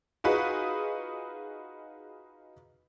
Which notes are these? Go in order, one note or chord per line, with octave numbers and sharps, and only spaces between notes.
D#4 F4 F#4 G#4 B4